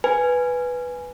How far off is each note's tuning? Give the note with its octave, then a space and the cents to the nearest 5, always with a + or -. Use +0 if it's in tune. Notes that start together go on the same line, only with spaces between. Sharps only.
B4 +0 G#5 +0